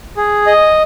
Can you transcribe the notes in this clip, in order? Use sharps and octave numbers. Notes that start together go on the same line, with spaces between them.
G#4
D#5